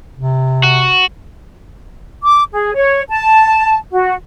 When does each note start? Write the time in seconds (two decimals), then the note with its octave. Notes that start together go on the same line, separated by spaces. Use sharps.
0.16 C3
0.64 F#4
2.22 D6
2.53 G#4
2.75 C#5
3.09 A5
3.90 F#4